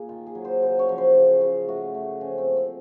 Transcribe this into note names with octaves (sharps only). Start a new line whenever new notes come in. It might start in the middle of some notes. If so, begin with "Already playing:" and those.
Already playing: A#2 A#3 G#4
D#3 F4
G#4
F#3
C5
C#3 C5
C#5
F3
C5
C#3
C#3
A3 F#4
A3
F3 C#4
C4
A#3
C4